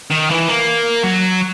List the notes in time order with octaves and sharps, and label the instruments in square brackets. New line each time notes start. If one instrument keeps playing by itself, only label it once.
[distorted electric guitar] D#3
E3
A#3
F#3